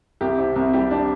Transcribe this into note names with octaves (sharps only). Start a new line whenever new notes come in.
C2 G4
C3
C2
G3 G4
D4